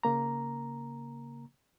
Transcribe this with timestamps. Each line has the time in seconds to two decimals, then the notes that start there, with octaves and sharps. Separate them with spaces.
0.03 C#3 A#3 A#5